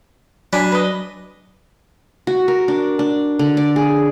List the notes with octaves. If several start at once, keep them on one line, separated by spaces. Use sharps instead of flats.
F#3 D4 G#5 B5
B4 D#5
F#4
A#4
D4
D4
D3
D5
G#4